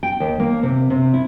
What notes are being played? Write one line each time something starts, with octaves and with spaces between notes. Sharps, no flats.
G5
D#2
A#3
C3
C3
E4